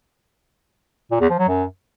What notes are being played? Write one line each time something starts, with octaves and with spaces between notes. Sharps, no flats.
A#2
E2
F3
F#3
F#2